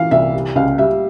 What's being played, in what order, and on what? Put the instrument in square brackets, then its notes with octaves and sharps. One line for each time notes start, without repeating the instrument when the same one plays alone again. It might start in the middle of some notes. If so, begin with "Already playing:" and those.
Already playing: [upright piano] E3 [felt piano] F5
[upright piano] C2 [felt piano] E5
[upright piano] G3
[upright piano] C#2 [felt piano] F5
[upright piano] G3 [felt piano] E5